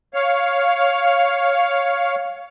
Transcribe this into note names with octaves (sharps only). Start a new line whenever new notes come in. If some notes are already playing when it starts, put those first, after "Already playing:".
C#5 F5